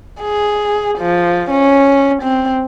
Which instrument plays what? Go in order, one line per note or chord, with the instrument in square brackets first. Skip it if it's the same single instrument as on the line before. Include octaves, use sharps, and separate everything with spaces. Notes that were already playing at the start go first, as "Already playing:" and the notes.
[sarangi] G#4
F3
C#4
C4